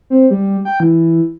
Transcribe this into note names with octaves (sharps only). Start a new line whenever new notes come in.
C4
G3
G5
E3